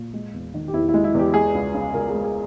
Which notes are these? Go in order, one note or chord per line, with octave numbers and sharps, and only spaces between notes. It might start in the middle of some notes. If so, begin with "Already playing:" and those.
Already playing: A#2
G#3
E2
D#3
G4
E2 E4
E4
G#3
E4
E2 G4
G#3 G#4
C#2
C#3
C#2 A#4
G#3 G#4
G#4